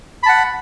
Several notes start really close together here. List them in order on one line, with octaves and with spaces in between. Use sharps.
B5 A5 F#5